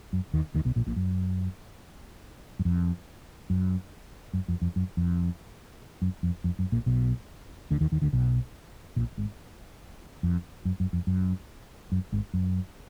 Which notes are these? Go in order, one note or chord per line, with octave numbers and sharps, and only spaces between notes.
F#2
D#2 D#3
D#2 D#3
B1 B2
A#1 A#2
A#1 A#2
F#2
F#2
F2
F#2
F#2
F2
F2
F#2
F2
F#2
F2
F2
F#2
A#1 A#2
B1 B2
D2 D3
D#2 D#3
D#2 D#3
D2 D3
B1 B2
A#1 A#2
G#1 G#2
F2
F#2
F#2
F2
F#2
F#2
G#1 G#2
F#2